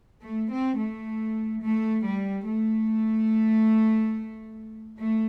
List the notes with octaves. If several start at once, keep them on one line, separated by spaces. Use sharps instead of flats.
A3
C4
A3
A3
G3
A3
A3